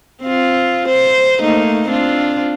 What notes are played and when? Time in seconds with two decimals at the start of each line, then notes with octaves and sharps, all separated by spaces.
0.23 C4 F4
0.88 C5
1.40 A3 A#3 D#4
1.88 C4 D4 F4